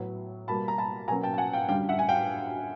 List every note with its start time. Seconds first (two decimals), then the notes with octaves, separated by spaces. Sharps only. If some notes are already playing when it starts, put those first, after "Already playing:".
Already playing: A2 F#3 B3
0.48 B2 G3 A#3 A5 B5
0.68 A#5
0.78 A5 B5
1.08 B2 F#3 A#3 C#4 G#5 A#5
1.23 G5 A5
1.34 A5
1.38 F#5 G#5
1.53 F5 G5
1.69 F#2 D3 G3 F5 G5
1.89 E5 F#5
1.99 G#5
2.09 F5 G5